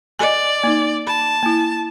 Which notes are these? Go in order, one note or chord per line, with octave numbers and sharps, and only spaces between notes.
D5 D#5 G#5
A#3 D#4
A5 B5
A#3 E4